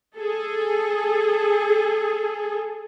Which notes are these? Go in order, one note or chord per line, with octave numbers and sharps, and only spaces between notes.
G#4 A4